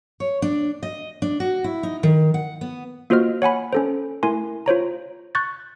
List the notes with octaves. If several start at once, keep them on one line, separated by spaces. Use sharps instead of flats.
C#5
D4
D#5
D4
F#4
E4
D#4
D#3
F#5
B3
A#3 F4 F#4 C5 D#5 F6
C#5 F#5 G#5 B5
C#4 A4 C5
A3 E4 A#4 G#5 C6
F4 C5 C#5 A#5
C#6 F#6 G6 A6